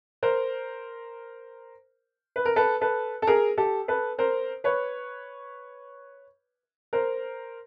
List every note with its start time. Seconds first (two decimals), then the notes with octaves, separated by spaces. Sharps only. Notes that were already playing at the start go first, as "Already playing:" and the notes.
0.23 A#4 C5
2.36 B4
2.45 A#4
2.56 A4 B4
2.81 A4 B4
3.22 A4
3.27 G#4 A#4
3.57 G4 A4
3.88 A4 B4
4.19 A#4 C5
4.64 B4 C#5
6.93 A#4 C5